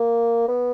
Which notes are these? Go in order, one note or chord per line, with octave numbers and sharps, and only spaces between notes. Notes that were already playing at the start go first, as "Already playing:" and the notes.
Already playing: A#3
B3